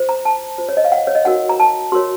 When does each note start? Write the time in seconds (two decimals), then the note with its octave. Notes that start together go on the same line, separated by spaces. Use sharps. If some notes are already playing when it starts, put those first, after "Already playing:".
Already playing: F4 C5
0.09 A#5
0.25 A5
0.58 F4 C5
0.69 C#5
0.77 D#5
0.85 F5
0.92 F#5
1.07 C#5
1.15 D#5
1.25 D#4 F#4 A#4 F#5
1.49 A#5
1.60 A5
1.92 F#4 A#4 C#5 C6